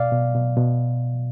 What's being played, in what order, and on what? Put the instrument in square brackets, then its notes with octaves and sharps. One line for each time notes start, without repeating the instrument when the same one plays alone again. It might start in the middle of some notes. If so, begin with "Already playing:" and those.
Already playing: [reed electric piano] B2 D5 F5
B2
B2
B2